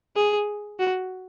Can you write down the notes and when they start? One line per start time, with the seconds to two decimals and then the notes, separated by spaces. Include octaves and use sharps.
0.16 G#4
0.80 F#4